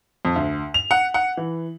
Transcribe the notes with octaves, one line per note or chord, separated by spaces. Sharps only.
F2
D2
F7
F#5
F#5
E3